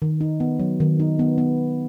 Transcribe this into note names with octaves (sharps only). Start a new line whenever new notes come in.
D#3
D#4
B3
F#3
D#3
D#4
B3
B3